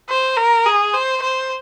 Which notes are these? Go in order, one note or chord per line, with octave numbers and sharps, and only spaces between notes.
C5
A#4
G#4
C5
C5